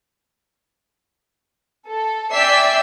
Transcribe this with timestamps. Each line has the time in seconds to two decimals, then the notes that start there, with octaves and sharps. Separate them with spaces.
1.87 A4
2.32 D5 E5 G5 G#5 E6 C7